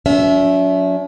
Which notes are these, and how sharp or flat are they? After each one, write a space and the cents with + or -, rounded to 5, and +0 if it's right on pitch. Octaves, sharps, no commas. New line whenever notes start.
F#3 -35 C#4 +45 E5 +0